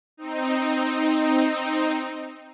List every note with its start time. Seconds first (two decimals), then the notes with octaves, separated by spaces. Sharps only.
0.17 C4 D#4